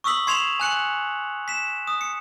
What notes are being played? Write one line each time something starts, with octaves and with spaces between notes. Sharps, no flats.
C#6 D#6 E6 B6 F#7
C6 C#6 G#6 C7 E7 F7
G#5 F#6 C#7 F#7
B6 E7
D#6
C#7